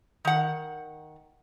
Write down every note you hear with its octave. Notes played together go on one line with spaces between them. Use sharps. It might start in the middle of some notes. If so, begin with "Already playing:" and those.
D#3 F#5